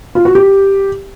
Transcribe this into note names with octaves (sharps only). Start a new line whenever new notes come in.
F4
F#4
G4